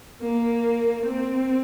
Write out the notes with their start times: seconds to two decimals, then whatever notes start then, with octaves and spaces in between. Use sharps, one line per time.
0.22 A#3
1.06 C4